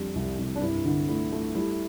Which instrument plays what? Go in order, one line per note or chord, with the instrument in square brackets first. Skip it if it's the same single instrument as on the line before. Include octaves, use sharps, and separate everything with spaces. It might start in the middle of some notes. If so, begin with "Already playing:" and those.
Already playing: [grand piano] F2 D3 G3 D4
C2
C2
[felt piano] D4
[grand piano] G2 [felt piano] E4
[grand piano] D3
[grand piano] A3 [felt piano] E4
[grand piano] A3
[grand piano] G3 [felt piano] E4